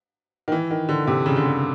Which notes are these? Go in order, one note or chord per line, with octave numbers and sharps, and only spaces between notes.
D#3
E3
D#3
D3
C3
C#3
D3
C#3